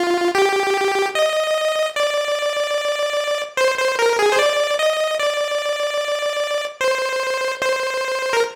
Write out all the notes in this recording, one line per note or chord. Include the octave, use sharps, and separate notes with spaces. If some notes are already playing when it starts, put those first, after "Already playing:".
Already playing: F4
G4
D#5
D5
C5
C5
A#4
G#4
C5
D5
D#5
D5
C5
C5
A#4